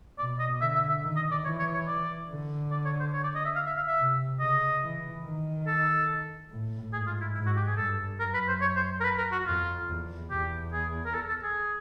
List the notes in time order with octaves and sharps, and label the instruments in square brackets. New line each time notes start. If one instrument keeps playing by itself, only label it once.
[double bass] B2 [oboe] D5
[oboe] D#5
[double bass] D3 [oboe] E5
[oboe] E5
E5
[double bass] D#3
[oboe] D#5
D5
[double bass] E3 [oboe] C#5
[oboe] C#5
C#5
D5
[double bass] D3
[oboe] D5
C#5
C5
C#5
D5
D#5
E5
F5
E5
F5
E5
[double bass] C3
[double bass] C#3 [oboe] D#5
[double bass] E3
D#3
[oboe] A4
[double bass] A2
[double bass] G#2 [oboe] G#4
[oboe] F4
E4
[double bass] G#2 [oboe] E4
[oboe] F#4
G4
G#4
[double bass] G2 [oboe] A4
[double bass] F#2 [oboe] A#4
[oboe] B4
C5
C#5
C5
A#4
B4
A#4
F#4
[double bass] F2 [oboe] F4
[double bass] E2
[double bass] E2 [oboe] G4
[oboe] G#4
A#4
A4
A4
G#4